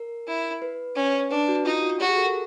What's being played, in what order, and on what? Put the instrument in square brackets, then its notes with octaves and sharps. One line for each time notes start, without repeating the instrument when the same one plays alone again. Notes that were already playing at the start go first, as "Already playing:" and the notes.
Already playing: [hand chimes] A#4
[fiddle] E4
[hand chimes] B4
[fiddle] C#4
[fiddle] D4 [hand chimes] B4
[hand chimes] F#4
[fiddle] D#4 [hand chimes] F4
[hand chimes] F#4
[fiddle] F#4 [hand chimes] G4
[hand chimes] G#4
A4
A#4